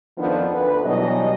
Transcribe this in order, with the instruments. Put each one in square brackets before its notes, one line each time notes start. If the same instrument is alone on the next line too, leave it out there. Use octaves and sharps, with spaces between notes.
[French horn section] F2 D#3 F3 B3 C4 D4
D2 B4
B2 E3 F#3 G3 D#5